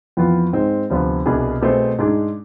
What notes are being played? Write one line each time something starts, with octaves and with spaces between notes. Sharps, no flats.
F2 E3 B3 F4
G#2 G#3 C4
D2 C3 F3 B3
C2 B2 B3 D4 G#4
B2 A3 C4 G#4 C5
G#2 G#3 D4 G#4